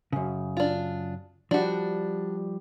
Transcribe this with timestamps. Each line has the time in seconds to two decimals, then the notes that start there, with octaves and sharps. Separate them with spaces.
0.13 F#2 C#3
0.57 D4 F4
1.51 F3 G3 D4 F#4